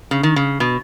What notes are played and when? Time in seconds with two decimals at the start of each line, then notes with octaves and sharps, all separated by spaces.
0.11 C#3
0.23 D#3
0.36 C#3
0.60 B2